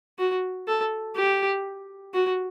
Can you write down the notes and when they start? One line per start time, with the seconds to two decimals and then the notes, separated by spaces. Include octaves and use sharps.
0.19 F#4
0.67 A4
1.16 G4
2.14 F#4